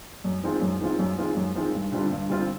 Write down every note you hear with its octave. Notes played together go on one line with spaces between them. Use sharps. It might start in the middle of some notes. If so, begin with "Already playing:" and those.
F#2
D#3 G#3 C4 F4
F#2
D#3 G#3 C4 F4
F#2
D#3 G#3 C4 F4
F#2
D#3 G#3 C4 F4
G2
D3 G3 C4 F4
G2
D3 G3 C4 F4